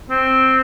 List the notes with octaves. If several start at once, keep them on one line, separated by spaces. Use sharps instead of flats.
C4